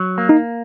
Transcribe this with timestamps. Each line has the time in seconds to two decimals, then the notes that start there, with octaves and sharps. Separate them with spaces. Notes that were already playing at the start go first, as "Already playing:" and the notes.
Already playing: F#3
0.18 A#3
0.29 D#4